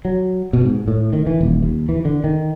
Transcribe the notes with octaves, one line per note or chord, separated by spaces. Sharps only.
F#3
B2
G#2
A2
D#3
E3
D#1
D#2
E3
D3
D#3